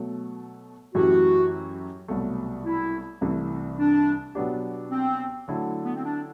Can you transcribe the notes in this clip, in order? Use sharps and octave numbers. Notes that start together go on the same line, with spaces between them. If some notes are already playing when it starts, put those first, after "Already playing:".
Already playing: B2 F#3 A3
F#2 E3 A3 E4 F#4 G4
C2 B2 F#3 A3
E4
C2 C3 E3 A3
D4
B2 F#3 B3 D4 G4
C4
D3 F#3 A3 E4
B3
C4
D4